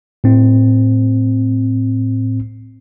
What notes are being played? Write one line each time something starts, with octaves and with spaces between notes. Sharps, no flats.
A2 C4